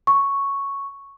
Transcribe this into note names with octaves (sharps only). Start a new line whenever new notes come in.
C#6